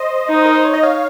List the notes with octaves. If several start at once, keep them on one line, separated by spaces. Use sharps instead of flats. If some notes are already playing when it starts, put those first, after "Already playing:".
Already playing: C5 D#5
D#4
A#4
C5
C#5
D#5
C#5 F5